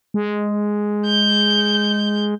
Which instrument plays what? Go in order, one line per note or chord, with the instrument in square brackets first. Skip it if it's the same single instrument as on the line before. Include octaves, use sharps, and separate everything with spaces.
[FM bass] G#3
[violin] G6